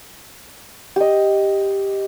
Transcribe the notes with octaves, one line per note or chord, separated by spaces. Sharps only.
G4 D#5